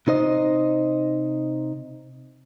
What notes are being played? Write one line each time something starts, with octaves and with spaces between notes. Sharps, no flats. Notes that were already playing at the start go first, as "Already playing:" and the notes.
C3 D#4 C5 D#5